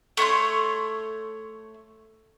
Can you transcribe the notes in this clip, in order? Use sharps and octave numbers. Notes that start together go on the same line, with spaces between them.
A3 C#5 A#5 C6